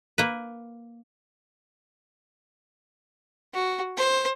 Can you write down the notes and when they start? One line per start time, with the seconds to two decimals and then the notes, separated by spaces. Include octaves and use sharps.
0.18 A#3 B4
3.54 F#4
3.97 C5